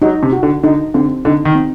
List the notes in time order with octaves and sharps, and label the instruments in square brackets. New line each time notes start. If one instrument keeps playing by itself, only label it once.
[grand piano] F#3 [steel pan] D#4
[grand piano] C3
[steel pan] F#4
[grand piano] D3
[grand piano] D3 [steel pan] D#4
[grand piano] D3 [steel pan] C4
[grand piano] D3 [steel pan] D#4
[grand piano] D#3
[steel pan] C4